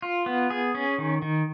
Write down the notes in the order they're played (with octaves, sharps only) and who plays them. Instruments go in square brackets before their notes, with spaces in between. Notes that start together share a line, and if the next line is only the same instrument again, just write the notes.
[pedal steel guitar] F4
B3
G#4
C#4
D#3
D#3